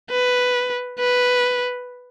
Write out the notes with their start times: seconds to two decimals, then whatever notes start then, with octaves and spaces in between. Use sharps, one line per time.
0.11 B4
0.99 B4